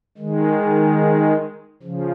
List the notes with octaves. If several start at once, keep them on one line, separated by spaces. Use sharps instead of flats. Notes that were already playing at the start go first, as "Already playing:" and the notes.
D#3 G#3
C#3 F3